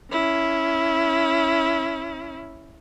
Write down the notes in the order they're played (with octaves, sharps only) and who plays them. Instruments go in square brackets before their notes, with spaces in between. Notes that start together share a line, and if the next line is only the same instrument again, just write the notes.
[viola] C#4 E4